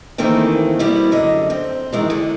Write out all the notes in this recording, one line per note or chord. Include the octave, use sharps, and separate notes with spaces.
C3 D#3 E3 A3 A#3 C4
B2 G3 C4 E4
F#2 D3 D#5
C4
D#3 E3 G#3
D3